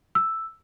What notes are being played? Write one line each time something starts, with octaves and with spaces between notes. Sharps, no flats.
E6